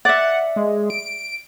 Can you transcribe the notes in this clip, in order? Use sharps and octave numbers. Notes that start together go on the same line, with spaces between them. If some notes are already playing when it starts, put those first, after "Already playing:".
D5 E5 F#5
G#3
D7